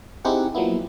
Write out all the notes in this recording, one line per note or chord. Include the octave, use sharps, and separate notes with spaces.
C4 D#4 E4 G4 G#4 F#5
F3 F#3 A#3 B3 E4